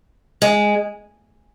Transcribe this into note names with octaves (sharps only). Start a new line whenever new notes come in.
G#3